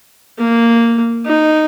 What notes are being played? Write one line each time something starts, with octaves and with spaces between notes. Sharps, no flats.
A#3
D#4